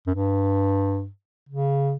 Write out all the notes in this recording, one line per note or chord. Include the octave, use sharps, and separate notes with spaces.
F#2
G2
C#3